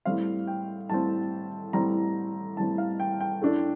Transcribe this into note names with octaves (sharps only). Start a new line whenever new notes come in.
A2 G3 C4 F5
G5
A2 G3 C4 A5
A2 G3 C4 A#5
A2 G3 C4 A5
F5
G5
G5
A2 A3 D4